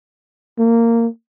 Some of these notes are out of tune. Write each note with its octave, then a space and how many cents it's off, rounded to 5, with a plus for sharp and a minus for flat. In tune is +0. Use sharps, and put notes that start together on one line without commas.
A#3 -15